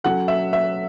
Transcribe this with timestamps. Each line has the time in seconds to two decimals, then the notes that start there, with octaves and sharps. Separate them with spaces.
0.04 F#3 C#4 F#4 A4 F#5
0.28 E5
0.53 E5